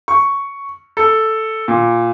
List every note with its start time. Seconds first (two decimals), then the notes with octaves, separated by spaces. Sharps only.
0.08 C#6
0.97 A4
1.68 A#2